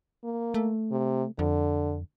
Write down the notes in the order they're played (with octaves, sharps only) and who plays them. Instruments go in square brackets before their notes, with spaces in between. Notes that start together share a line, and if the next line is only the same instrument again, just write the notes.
[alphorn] A#3
[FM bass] A3
[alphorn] C3
[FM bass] F2 [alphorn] D3